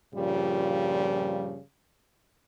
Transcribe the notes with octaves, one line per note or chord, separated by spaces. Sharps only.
G2 A#2 C#3 F3 G3